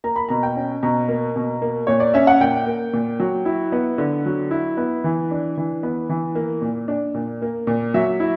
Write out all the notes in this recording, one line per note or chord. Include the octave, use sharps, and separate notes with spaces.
A#3 A#5
B5
B2 A#5
G5
C#4
B2 A#5
A#3
B2
A#3
A#2 C#5
D5
C#4 E5
F#5
A#2 G5
A#3
A#2
F#3
E4
B3
D3
F#3
E4
B3
E3
D4
E3
B3
E3
A#3
A#2
D4
A#2
A#3
A#2
F#3 E5
E4